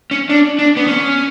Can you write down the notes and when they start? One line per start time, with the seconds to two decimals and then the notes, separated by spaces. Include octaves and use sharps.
0.11 C#4
0.30 D4
0.59 D4
0.77 B3
0.87 C#4